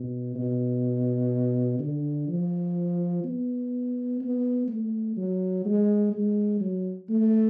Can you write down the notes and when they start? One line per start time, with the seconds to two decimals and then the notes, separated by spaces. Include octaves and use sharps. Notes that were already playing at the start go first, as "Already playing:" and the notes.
Already playing: B2
0.35 B2
1.79 D3
2.28 F3
3.24 B3
4.21 B3
4.68 A3
5.17 F#3
5.65 G#3
6.13 G#3
6.61 F#3
7.10 A3